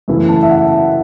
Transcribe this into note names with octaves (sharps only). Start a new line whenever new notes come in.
F#2 C#3 E3 A3 E4
A5
E5
F#5
E5